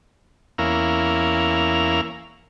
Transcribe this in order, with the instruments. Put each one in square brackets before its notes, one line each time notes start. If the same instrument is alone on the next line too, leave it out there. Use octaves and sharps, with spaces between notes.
[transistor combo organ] E2 A#3 C#4 E4 A#4 F5